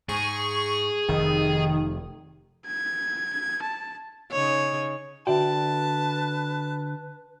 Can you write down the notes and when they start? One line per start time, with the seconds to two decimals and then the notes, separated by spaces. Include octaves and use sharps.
0.09 G#2 G#4 C#6
1.08 F1 D#3
2.67 G#6
3.63 A5
4.32 C#3 D#4 C#5
5.27 D3 F#4 B4 D5 E5 G5 A5